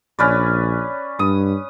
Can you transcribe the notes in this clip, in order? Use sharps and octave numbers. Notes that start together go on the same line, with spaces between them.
A#1 C#4 B4 D5
G2 D#6